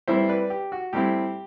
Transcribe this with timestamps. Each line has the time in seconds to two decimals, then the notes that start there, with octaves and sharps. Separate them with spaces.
0.08 A2 E3 G3 C4 E4 C5 E5
0.29 B4 D5
0.50 G4
0.72 F#4
0.93 A2 G3 C4 E4 G4